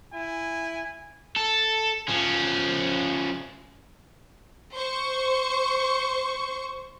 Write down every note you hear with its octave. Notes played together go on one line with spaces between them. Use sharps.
E4 G#5
A4
F3 C#4
C5 C#6